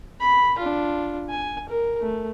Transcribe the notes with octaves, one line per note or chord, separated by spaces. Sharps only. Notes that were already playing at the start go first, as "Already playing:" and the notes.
B5
D4 F4
G#5
A#4
A3